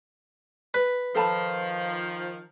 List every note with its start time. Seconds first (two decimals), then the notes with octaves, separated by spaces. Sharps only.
0.74 B4
1.15 D#3 F3 A4 A5 B5